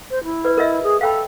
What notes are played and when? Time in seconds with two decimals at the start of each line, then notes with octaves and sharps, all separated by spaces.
0.11 C5
0.24 E4
0.45 B4 D5
0.57 A#4 D#5 E5
0.83 G#4
1.01 A4 F5 G5 B5